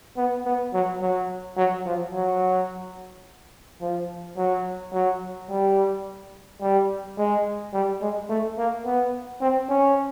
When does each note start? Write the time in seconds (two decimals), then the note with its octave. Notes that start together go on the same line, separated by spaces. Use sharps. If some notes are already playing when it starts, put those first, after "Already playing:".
0.17 B3
0.45 B3
0.73 F#3
1.02 F#3
1.57 F#3
1.86 F3
2.13 F#3
3.81 F3
4.37 F#3
4.93 F#3
5.50 G3
6.61 G3
7.18 G#3
7.73 G3
8.02 G#3
8.29 A3
8.58 A#3
8.85 B3
9.41 C4
9.69 C#4